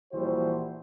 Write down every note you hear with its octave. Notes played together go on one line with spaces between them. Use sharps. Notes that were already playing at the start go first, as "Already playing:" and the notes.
A#1 E3 G3 F#4 C5